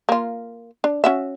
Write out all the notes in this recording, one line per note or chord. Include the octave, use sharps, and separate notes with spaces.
A#3 F4
D4
C#4 F#4 E5